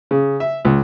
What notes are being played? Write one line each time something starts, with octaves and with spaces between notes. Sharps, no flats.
C#3
E5
C#2